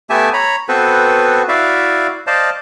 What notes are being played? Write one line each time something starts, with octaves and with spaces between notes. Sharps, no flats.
A3 B3 G4 E5 G#5 A5
C#5 A#5 B5
B3 C4 F#4 A4 B4 C5
E4 F#4 D5 E5 F5
C5 D5 D#5 F5 A5